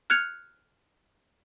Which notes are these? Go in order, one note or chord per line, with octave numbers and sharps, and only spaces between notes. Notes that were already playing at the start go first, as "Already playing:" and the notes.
F6 F#6 G#6 C#7 F7